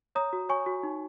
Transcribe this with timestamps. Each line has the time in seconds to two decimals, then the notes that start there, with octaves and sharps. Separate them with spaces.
0.15 C#5 A#5 D#6
0.33 F#4
0.49 C#5 G#5 C#6
0.66 F#4
0.83 D#4